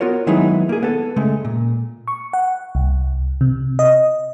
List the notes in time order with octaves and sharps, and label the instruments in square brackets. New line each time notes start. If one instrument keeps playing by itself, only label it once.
[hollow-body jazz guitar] B3 F4 F#4 A#4 C#5
D#3 F#3 G#3 B3 D#4 E4
A#3 G#4
B3 A4
C#3 G#3 A3
A#2
[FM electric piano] C#6
F#5
C2
C3
D#5